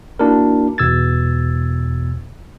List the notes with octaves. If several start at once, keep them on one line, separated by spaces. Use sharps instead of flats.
A#3 D4 E4 F#4 A#4
E2 B2 E6 G#6 A6